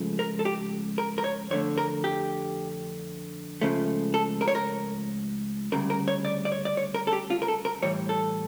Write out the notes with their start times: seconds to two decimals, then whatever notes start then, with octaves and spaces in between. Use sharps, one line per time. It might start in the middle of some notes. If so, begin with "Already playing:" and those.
Already playing: C#2 C#3 F3 A3
0.19 A#4
0.39 A4
0.45 G4
0.98 A#4
1.18 A#4
1.24 C#5
1.50 F2 D3 A3 C#5
1.78 A#4
2.04 G4
3.61 C#2 C#3 F3 A3
4.14 A4
4.41 A#4
4.48 C#5
4.55 A#4
5.72 D2 C#3 G3 A#4
5.90 A#4
6.08 C#5
6.25 D5
6.45 D5
6.52 C#5
6.65 D5
6.77 C#5
6.94 A#4
7.07 A4
7.13 G4
7.30 F4
7.42 A#4
7.48 A4
7.65 A#4
7.82 A2 E3 G3 C#5
8.09 A4